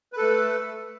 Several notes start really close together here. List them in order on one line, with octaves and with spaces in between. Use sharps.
B4 A4 A3